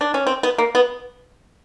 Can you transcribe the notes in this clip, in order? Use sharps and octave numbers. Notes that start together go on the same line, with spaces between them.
D4
C#4
C4
B3
A#3
B3